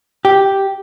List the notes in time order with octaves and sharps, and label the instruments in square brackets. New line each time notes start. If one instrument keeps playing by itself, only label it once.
[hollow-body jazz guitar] G4